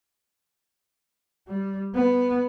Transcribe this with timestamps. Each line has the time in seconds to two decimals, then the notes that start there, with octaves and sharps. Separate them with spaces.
1.47 G3
1.95 B3